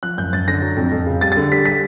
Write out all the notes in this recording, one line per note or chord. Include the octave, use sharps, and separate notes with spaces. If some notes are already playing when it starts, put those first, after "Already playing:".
F3 F#6
F#2 G6
F#2 A6
D3 A#6
F#3
F2
F2
C#3
G3 A6
A6
D3
G3 B6
B6